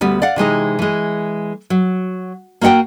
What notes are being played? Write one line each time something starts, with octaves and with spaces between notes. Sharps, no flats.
D2 G3 B3
D5 F5 F#5
C3 E3 G#3 D#4
E3 G#3
F#3
A#3 F#4 D#5 F#5 G5